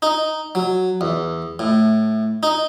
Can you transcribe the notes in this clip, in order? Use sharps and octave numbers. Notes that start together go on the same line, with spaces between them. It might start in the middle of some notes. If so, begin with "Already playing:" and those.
D#4
F#3
E2
A2
D#4